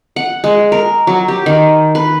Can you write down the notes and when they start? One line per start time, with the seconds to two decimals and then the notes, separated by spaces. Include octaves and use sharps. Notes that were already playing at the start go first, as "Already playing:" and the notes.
0.16 F#5
0.44 G#3
0.72 A#4
1.07 F#3
1.28 G4
1.46 D#3
1.95 B4